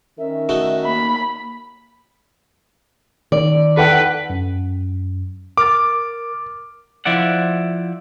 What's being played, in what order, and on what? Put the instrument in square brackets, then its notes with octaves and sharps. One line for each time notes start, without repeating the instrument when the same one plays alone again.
[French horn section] D#3 C#4 A#4 [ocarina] E5
[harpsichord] A3 D#4 F#4
[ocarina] A#3 [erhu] B5
[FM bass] D#3 [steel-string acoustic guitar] D5
[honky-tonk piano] A4 F#5 G5 [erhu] B4
[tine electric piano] F#2
[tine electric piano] A#4 F6 A6 [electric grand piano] D6
[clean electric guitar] F3 E4 D5 F#5